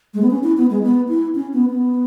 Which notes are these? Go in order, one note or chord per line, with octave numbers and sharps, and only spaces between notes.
G#3
B3
C#4
E4
B3
G#3
B3
E4
C#4
B3
B3